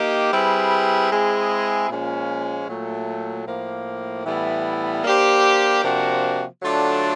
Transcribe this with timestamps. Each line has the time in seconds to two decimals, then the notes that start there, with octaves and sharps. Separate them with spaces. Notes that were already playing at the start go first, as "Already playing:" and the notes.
Already playing: A#3 D#4 G4
0.32 G3 C4 E4 G#4 B4
1.11 G#3 C4 E4 G#4
1.89 A#2 F3 G#3 C#4
2.68 A#2 F#3 A3
3.46 A2 F3 A#3
4.25 A2 E3 G3 B3 E4
5.04 A#3 D4 G4 C5
5.83 C3 F3 A#3 D4 F#4
6.61 D3 F#3 A3 D4 F4